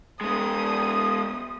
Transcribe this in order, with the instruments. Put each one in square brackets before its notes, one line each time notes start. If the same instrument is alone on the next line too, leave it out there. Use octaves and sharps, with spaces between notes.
[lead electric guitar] G#3 B3 [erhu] D#6